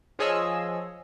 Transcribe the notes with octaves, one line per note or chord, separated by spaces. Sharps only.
F3 F4 G#4 C#5 D#5 E6